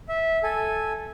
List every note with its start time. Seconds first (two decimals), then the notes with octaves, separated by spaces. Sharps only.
0.09 E5
0.43 A4 G#5